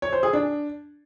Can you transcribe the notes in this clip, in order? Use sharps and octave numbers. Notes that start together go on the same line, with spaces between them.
C#5
C5
G#4
D4